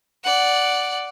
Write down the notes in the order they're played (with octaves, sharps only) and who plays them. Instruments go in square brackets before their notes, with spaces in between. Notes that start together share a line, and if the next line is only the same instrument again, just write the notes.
[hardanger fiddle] D5 F#5